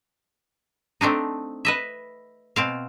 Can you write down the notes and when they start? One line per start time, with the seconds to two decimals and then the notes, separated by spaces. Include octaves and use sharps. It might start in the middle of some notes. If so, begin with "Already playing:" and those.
1.01 A3 C4 D4 D#4
1.65 B4 D#5 E5
2.56 B2 C4 F5